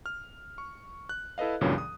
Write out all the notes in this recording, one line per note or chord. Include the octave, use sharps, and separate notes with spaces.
F6
C#6
F#6
E4 A4 B4 D#5 F5
C#2 G2 A#2 C#3 E3 F#3
D#6